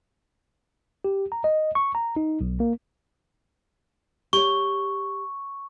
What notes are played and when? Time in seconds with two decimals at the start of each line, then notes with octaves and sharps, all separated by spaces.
1.04 G4
1.32 A#5
1.44 D#5
1.75 C#6
1.95 A#5
2.16 D#4
2.41 B1
2.60 A#3
4.33 G4 C#5 C#6